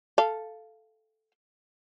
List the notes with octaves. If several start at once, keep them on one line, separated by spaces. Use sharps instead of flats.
A4 F5